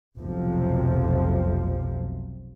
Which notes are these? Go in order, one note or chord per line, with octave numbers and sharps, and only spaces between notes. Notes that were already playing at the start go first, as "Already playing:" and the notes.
F1 B1 F2 C3 F3